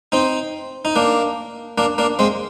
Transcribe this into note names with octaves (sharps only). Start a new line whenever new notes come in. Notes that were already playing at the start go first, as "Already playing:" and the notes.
C4 D#4
D#4
A#3 D4
A#3 D4
A#3 D4
G#3 C4